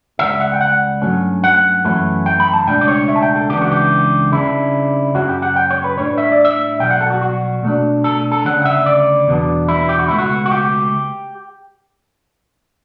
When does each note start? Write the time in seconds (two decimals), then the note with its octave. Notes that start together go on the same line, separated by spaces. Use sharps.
0.19 C#2 C#3 G3 E5
0.40 F#5
0.54 G5
0.61 F#5
1.02 G2 F#3 A3 C#4
1.44 F#5
1.84 F#2 E3 A3 C#4 E4
2.26 G5
2.40 B5
2.54 A5
2.67 C#2 B2 A3 D4 G5
2.81 D5
2.88 C#5
3.08 E5
3.16 A5
3.22 G5
3.36 A4
3.49 C#2 C#3 E3 B3 D4 G4
3.61 F#4
3.71 G4
4.32 C#3 G3 D4 E4
5.15 F#2 C#3 F#3 C#4 F#4
5.28 G4
5.42 F#5
5.56 G5
5.71 C#5
5.84 B4
5.97 A2 G3 D4 C#5
6.18 E5
6.32 D5
6.45 E5
6.80 B1 B2 G3 G5
6.91 F#5
7.01 A4
7.10 F#4
7.21 F#4
7.63 B2 A3 D4
8.04 A4
8.32 A4
8.45 D2 C#3 G3 C#4 F#5
8.62 F#5
8.65 E5
8.86 D5
9.27 E2 B2 G3 B3 D4
9.68 E4
9.89 G4
9.99 F#4
10.08 C#2 B2 A3 E4
10.19 F#4
10.46 F#4
10.51 G4